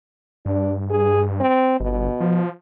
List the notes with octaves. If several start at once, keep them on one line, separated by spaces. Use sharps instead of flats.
G2 D4
G#4
C4
G1 B2
F3